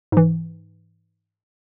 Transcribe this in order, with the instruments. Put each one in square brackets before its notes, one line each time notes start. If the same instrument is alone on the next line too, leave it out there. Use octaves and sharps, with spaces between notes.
[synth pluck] G#2 E3